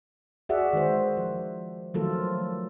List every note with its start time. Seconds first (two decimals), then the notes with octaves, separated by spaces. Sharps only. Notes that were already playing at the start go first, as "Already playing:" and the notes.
0.49 F#4 G#4 D5 E5 F#5
0.73 D#3 G#3 C5
1.17 F3
1.94 D#3 F3 F#3 A3 F4 A4